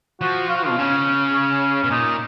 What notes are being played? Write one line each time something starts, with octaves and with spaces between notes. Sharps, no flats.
F3 F#4
F4
F#4
B2 F4
C#3 C#4
B2
A#2 D#4